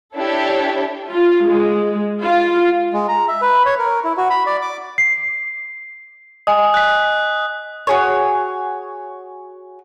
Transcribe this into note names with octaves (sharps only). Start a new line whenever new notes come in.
D4 E4 G4 A4 C#5 E5
F4
G#3
F4
G#3
A#5
E5
B4
C#5
A#4
E4
F#4
B5
D5
D6
C7
D#5 G#5 D#6
F#6 B6
F#4 G#4 C#5